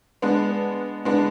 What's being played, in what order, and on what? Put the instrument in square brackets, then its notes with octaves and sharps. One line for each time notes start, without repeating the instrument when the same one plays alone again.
[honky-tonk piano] G#3 B3 D4
G#3 B3 D4